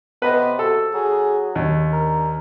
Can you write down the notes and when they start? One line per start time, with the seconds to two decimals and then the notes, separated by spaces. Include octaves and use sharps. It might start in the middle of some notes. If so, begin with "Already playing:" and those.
0.22 C3 B3 B4 D#5
0.59 F#4 A4
0.94 F#3 G#4
1.55 D#2 D4
1.92 A#4